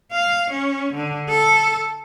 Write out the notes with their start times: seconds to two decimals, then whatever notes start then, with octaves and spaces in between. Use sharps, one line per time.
0.12 F5
0.50 C#4
0.94 D3
1.29 A4